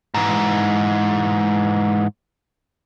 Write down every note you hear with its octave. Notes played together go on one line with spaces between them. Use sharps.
G#2 E3